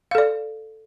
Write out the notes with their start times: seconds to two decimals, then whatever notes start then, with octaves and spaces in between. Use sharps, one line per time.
0.11 F5
0.15 A4
0.18 D5